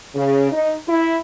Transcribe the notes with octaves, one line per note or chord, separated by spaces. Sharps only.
C#3
D#4
E4